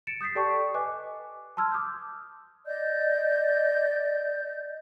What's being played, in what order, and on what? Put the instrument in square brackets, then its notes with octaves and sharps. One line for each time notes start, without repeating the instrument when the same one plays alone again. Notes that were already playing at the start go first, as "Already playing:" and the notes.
[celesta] A6 C#7 D7 E7
D#6 G6 A6 B6 C7
G4 A4 D5 G5 A5 C#6
B4 D#5 G#5 D6 F#6
A5 C6 E6 F6 G#6
D6 D#6 F6 G6
[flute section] D5 D#5 G6